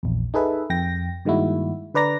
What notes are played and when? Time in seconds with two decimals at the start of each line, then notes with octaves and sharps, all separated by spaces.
0.03 A#1 E2
0.34 D#4 G#4 A4 B4 E5
0.70 F2 G5 A#6
1.25 G2 D#3 G#3 A#3 E4 F#4
1.95 D3 B4 D5 A#5 A#6